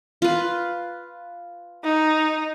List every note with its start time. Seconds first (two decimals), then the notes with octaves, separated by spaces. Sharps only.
0.22 F4 B4
1.84 D#4